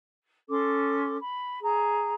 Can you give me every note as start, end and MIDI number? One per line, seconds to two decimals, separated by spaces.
0.49 1.17 61
0.49 1.17 69
0.49 1.17 84
0.49 1.17 86
1.20 1.61 83
1.62 2.14 68
1.62 2.14 82